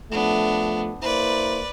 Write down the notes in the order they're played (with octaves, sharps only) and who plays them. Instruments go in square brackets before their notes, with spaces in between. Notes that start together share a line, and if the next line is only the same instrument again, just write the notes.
[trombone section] F3 A3 [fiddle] B3 D4
[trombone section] A#3 E4 C5 [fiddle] B4 D5